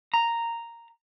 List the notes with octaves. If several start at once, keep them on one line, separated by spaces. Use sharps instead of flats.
A#5